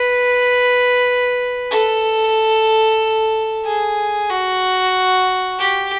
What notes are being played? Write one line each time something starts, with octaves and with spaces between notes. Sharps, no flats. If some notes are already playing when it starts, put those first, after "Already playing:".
Already playing: B4
A4
G#4
F#4
G4